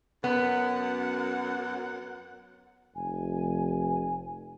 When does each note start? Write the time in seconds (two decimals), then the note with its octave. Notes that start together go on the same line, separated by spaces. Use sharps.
0.24 F#2 B3 F#5
2.95 F1 G#5